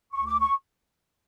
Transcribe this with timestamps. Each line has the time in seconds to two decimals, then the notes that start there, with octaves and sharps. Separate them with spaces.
0.12 D2 C#6
0.27 D6
0.40 C#6